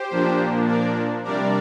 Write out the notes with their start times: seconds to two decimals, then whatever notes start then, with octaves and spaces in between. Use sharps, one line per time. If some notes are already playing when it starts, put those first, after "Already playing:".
Already playing: G4 C5
0.10 A#2 F3 A#3 D4
0.67 A#4 D5
1.24 C3 G3 D4 A#4 D5